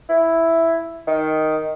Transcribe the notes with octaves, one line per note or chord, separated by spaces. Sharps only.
E4
D#3